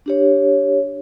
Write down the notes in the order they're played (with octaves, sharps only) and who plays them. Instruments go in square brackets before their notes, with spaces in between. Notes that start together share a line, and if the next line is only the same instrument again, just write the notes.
[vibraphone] D4 G4 C#5